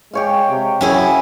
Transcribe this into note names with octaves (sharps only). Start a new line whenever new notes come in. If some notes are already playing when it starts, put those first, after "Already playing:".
G#3 G4 C#5 F5
C3
F#2 C#4 E4 G#4